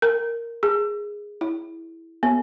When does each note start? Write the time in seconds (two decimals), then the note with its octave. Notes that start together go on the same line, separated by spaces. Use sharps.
0.02 A#4
0.63 G#4
1.41 E4
2.23 B3